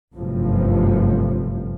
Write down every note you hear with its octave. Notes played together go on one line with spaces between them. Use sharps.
G1 F#2 A2 C3 F3